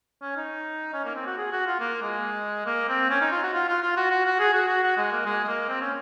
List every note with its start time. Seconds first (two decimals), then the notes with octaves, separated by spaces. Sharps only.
0.22 C#4
0.37 D#4
0.93 C#4
1.05 A#3
1.15 C4
1.26 F#4
1.38 G#4
1.51 F#4
1.66 F4
1.80 A#3
2.02 G#3
2.66 A#3
2.89 C4
3.10 C#4
3.21 D#4
3.31 F4
3.43 F#4
3.53 F4
3.68 F4
3.82 F4
3.97 F#4
4.10 F#4
4.26 F#4
4.39 G#4
4.53 F#4
4.68 F#4
4.83 F#4
4.97 G#3
5.12 A#3
5.25 G#3
5.43 G#3
5.47 A#3
5.69 C4
5.81 C#4